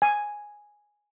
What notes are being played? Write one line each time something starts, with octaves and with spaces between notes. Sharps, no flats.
G#5